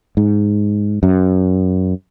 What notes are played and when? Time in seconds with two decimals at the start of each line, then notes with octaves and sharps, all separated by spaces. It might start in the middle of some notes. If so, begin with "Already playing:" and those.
0.17 G#2
1.03 F#2